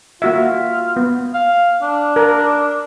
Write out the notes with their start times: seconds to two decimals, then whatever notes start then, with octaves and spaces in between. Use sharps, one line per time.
0.22 A#3 F4 F#4 E5
0.97 B3
1.34 F5
1.82 D4
2.16 A#4